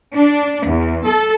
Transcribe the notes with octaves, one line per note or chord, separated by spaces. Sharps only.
D4
E2
A4